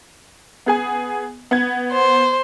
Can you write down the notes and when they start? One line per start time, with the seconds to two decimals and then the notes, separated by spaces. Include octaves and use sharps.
0.66 B3 G#4 G#5
1.51 B3 G#6
1.92 C5